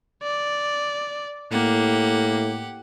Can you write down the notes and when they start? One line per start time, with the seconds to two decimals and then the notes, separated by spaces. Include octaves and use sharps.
0.23 D5
1.52 A2 A#3 G4 F#5